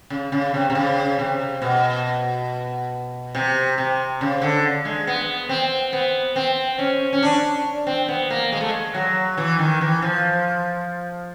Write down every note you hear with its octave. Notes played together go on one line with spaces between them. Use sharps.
C#3
C#3
C3
C3
C#3
C3
B2
C3
C3
C#3
D3
G#3
B3
C4
B3
C4
C#4
C#4
D4
C4
B3
A#3
G#3
A3
G#3
F#3
E3
D#3
E3
F3